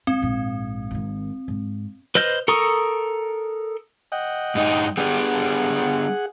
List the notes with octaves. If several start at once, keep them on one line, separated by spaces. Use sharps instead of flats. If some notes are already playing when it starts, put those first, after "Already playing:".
G#2 C4
A#1 G#2
G#1 D#3
G#2
B4 C5 D#5 F6 G6
A4 A#4 A#5 C#6 D#6
D#5 F#5 G5
G2 D#4
G3 B3 D4 G#4 F#5